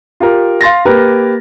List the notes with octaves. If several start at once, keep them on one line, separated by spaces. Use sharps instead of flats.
F4 G4 A#4
F5 C6 A6 A#6
A#3 G4 A#4 B4